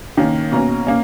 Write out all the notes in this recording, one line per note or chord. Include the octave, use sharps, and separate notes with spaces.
D#3 A#3 C#4
B2 A#3 C#4 A#5
A#3 C#4